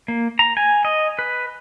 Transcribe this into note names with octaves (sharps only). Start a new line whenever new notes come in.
A#3
A#5
G#5
D#5
B4